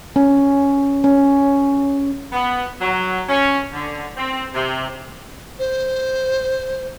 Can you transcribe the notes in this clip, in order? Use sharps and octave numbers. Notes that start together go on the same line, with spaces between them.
C#4
C#4
B3
F#3
C#4
D3
C4
C3
C5